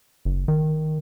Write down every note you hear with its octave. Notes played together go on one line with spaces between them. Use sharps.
F#1
D#3